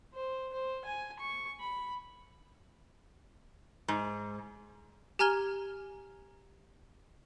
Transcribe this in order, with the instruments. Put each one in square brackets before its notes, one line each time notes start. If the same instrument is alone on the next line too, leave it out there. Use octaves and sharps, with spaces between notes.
[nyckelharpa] C5
C5
G#5
C#6
B5
[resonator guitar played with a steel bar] G#2
[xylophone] G4 G#5 A#5 F6 G#6 G7